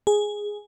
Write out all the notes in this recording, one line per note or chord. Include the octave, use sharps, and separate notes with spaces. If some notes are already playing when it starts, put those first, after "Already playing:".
G#4